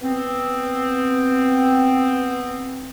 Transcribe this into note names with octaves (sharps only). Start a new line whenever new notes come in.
B3 C4